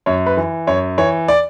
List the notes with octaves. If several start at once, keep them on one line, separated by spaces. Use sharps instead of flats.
F#2 C#5
B4
E3
F#2 C#5
E3 C#5
D5